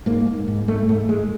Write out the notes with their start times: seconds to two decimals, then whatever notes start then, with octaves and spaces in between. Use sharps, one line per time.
0.06 G#2 A#3
0.27 G#2
0.48 G#2
0.68 G#2 A3
0.89 G#2 A3
1.09 G#2 G#3